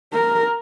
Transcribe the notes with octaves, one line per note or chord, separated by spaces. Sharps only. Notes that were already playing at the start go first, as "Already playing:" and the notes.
A#4